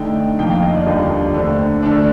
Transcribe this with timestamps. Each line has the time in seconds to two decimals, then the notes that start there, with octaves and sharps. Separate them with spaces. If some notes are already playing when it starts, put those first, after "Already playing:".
Already playing: D3 A3 D#4 G5
0.39 F2 D#3 A#3 G5
0.51 F5
0.62 D#5
0.75 D5
0.86 D#2 D3 G3 D4 F4
1.34 D3 A3 C4
1.82 D3 A3 D4